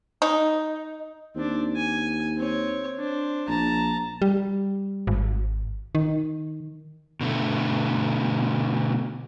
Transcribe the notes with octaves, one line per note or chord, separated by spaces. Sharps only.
D#4
D#2 C4 D4
G#5
C4 C#5
D4 C5
A#1 A5 A#5
G3
G#1
D#3
B2 D3 A3